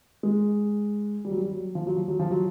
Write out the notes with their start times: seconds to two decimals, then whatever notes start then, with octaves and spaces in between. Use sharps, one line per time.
0.23 G#3
1.25 G3
1.31 F#3
1.38 G3
1.50 F#3
1.75 F3
1.87 F#3
1.97 F3
2.08 F#3
2.20 F3
2.31 F#3